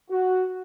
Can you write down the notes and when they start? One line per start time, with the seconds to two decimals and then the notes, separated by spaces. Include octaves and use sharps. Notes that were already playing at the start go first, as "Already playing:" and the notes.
0.10 F#4